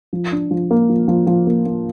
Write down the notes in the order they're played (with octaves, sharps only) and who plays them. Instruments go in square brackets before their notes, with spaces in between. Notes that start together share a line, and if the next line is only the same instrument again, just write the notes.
[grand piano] F3
D4
F3
A#3
F3
F3
F3
A#3
A#3